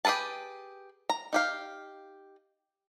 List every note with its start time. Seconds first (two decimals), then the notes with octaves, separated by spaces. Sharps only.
0.05 G4 G#4 A#4 B4 A5
1.09 A#5
1.33 D#4 G4 F5